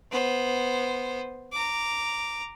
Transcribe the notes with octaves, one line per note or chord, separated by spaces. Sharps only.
B3 C5
A#5 D6